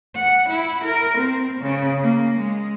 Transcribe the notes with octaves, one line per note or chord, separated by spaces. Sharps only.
F#5
E4
A#4
C4
C#3
A#3
G#3